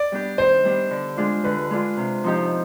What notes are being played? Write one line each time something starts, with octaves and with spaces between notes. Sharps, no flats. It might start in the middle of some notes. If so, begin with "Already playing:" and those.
Already playing: D5
G3 B3 D4 G4
D#3 C5
G3 B3 D4 G4
D3
G#3 D4 F4
D3 B4
G#3 D4 F4
C3
F3 C4 D#4 G4